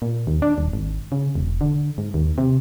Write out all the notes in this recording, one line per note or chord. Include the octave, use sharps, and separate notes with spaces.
A#2
D#2
D4
D#1
G#1
C#3
E1
D3
G#2
D#2
C3